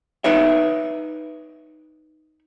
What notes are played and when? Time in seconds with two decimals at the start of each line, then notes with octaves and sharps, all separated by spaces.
0.24 D#4 B4 C#5 E5